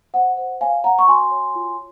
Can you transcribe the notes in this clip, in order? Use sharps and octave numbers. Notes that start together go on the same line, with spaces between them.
C5 F#5
C5 F#5
C#5 F5 G#5
C#5 F#5 A#5
C#6
F#4 G#5 C6
C#5
F4